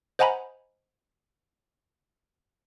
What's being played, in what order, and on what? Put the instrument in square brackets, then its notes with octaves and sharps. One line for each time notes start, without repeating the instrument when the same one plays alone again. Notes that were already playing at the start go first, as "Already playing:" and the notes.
[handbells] C5 D#5 F#5 G#5 A#5 B5